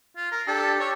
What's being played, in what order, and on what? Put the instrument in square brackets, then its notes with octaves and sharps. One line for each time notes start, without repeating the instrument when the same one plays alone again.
[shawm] F4
A#4
[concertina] D4 G4 [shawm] A4
[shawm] C#5